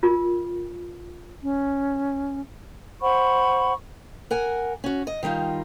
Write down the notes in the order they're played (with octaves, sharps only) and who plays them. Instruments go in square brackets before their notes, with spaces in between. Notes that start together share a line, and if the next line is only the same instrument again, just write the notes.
[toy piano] F4 A#4
[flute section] C#4
C5 F#5 B5 C#6
[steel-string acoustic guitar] A#4 F#5 G#5
C#4 F#4
D#5
D#3 G3 D#4 F4